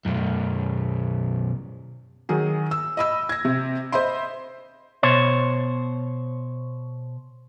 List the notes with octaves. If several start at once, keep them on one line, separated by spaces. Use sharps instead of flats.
B1 F#2
D#3 F#3 G#4
E6
D#5 B5 E6
G#6 A#6
C3
C5 D#5 E5 B5 C6
B2 C5 C#5